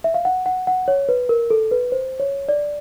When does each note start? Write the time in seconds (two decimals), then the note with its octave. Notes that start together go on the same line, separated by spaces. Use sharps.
0.04 E5
0.14 F5
0.25 F#5
0.46 F#5
0.67 F#5
0.88 C#5
1.09 B4
1.29 A#4
1.50 A4
1.71 B4
1.92 C5
2.20 C#5
2.49 D5